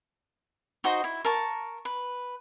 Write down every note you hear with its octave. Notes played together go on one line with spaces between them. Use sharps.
D#4 F#4 C5 D#5
E4
A#4 A5 C#6
B4